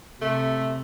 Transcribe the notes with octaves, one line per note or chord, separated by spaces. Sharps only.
C3 A3